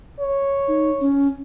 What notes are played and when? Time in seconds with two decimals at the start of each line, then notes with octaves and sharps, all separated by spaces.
0.20 C#5
0.68 D#4
1.01 C#4